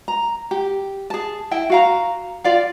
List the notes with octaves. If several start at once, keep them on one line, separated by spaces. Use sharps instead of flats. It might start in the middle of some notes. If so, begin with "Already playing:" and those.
A#5
G4
G#4 A5
E4 E5 G5
F#4 F5 A#5
F4 D5 F5